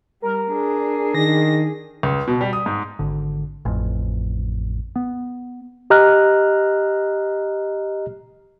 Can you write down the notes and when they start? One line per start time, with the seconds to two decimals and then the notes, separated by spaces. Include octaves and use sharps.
0.22 G3 A#4
0.51 D4 G#4
1.15 D#3 A#6
2.03 C#2
2.28 B2
2.41 G3
2.53 D#6
2.66 G#2
2.99 G#1 D3
3.65 A1 F2
4.96 B3
5.90 G4 D#5 A#5 F6 F#6